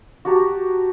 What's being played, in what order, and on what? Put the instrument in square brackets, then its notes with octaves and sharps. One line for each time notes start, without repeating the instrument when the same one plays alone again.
[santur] F#4 G4 A5 A#5